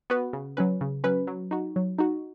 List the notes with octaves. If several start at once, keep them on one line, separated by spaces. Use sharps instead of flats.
B3 F#4 B4
C#3
F#3 C#4 B4
C#3
F#3 C#4 B4
F#3
D#4 F#4
F#3
D#4 F#4